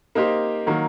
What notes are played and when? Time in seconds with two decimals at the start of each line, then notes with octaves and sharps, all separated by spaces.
0.15 A#3 D#4 G4 C5
0.67 D#3 F#3 A#3